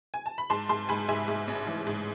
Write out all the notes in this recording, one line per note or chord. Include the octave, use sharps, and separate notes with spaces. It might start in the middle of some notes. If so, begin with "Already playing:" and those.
G#5
A5
B5
G#2 A5 C6
G#2 A5 C6
G#2 G#5 B5
G#2 E5 G#5
G#2
A1
E3
G#2